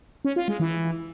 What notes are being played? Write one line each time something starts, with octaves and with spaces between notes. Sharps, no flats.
C#4
F4
G#3
E3